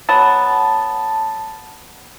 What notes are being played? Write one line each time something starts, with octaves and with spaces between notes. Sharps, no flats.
F#3 B3 A5